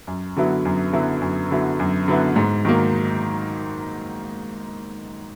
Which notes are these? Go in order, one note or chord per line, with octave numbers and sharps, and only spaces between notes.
F#2
D3 F#3 B3 E4
F#2
D3 F#3 B3 E4
F#2
D3 F#3 B3 E4
F#2
D3 F#3 B3 E4
G#2
D#3 F#3 A#3